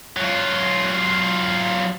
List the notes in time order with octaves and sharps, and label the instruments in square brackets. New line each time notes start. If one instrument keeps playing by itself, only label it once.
[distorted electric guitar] F#3 F4